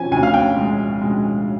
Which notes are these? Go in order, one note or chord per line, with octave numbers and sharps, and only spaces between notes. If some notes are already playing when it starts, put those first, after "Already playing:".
Already playing: F3 G#5
D2 G#5
F5
G5
G#3
G#3